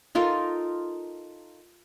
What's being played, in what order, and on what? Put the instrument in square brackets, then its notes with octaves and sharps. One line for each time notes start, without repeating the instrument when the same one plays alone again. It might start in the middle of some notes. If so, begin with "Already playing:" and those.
[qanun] D#4 F4 A4 A#4